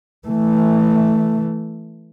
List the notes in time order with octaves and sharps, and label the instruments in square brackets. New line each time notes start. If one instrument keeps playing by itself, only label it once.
[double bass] E3 A3